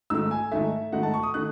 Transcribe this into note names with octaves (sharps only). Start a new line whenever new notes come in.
G#2 D#3 A3 E6
G#5
G#2 D#3 A3 E5
G#2 D#3 A3 F#5
A5
C#6
D#6
D#3 A3 F#6